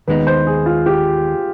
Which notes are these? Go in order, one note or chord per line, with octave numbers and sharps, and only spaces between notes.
D#2 D#3 G#3 B3 D#4 B4
C5
G#4
F4
G4